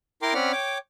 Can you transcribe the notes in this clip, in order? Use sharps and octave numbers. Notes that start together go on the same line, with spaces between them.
E4 A#4 G5 A#5 C6 D6
C4 C#4 D5 F#5 B5 F6
C#5 G5 D6